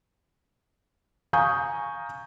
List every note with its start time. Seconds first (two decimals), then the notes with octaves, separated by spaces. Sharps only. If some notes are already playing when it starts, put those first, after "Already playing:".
1.33 F5 G#5 A#5 C#6 D#6 G6